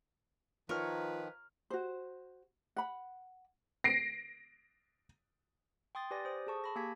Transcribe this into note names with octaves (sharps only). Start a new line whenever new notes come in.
D#3 F3 F4 A#4 B4 C#5 F6
F#4 C5
F#5 B5
A#6 C7 D7
G5 C6 D#6 A6
G4 B4 D5 G#5 A#6
C5 D#6
G#4 A4 A5 C#6
A5 B5 A#6
A#3 G4 G#5 G#6 B6